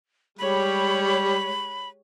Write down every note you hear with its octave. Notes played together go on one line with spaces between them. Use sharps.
G3 G#3 G4 C#5 B5